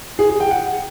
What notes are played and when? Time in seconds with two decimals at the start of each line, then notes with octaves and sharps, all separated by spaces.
0.19 G#4
0.30 G#4
0.40 G5
0.51 F#5